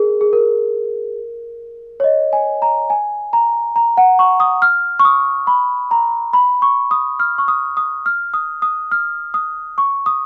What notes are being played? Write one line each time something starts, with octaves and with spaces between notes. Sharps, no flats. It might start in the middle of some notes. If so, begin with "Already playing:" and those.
Already playing: G#4 A#4
G#4
A#4
C#5
D#5
G#5
A#5
G#5
A#5
A#5
F#5
C#6
D#6
F6
C#6
D#6
B5
A#5
B5
C#6
D#6
F6
C#6
D#6
D#6
F6
D#6
D#6
F6
D#6
C#6
D#6